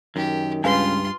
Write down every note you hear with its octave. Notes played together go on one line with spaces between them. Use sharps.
F#2 D#3 G4
C#2 G2 F4 B4 F5 G#5 C6